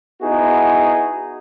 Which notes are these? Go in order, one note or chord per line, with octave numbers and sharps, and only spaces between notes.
B3 D#4 E4 F#4 G#4